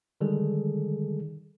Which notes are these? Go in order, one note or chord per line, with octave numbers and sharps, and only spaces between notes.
D3 D#3 G3 G#3 G#4 A4